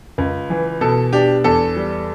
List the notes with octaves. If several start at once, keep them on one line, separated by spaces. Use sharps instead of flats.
C#2
E3
B2 A4
D4 G4
E2 A4
G3